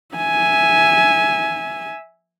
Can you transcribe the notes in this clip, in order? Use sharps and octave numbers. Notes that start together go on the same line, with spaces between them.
E5 G#5